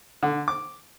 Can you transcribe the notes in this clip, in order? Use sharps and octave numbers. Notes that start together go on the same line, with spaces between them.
D3
D6